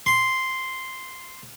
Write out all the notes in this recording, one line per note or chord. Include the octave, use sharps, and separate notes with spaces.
C6